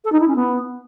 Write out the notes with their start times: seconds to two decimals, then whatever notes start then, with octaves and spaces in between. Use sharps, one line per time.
0.04 A4
0.12 D#4
0.20 E4
0.28 C#4
0.35 B3